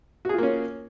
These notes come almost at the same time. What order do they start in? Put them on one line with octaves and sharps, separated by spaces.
F#4 G#4 F4 A#3 C#4